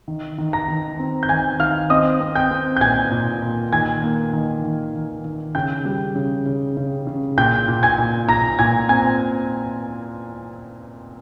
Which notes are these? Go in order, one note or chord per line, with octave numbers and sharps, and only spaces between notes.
D#3
D#3
A#5 A#6
D#3
C4
G6
D#3 G#5 G#6
D#3 F5 F6
C4 D#5 D#6
C4
G5 G6
C4
G6
A#2 G#5 G#6
A#2
A#2
D#3 G#5 G#6
A#3
D#3
D#3
D#3
D#3
C#3 G5 G6
G3
C#3
C#3
C#3
C#3
A#2 G5 G6
A#2
G#5 G#6
A#2
A#2 A#5 A#6
A#2 G#5 G#6
C4 G#5 G#6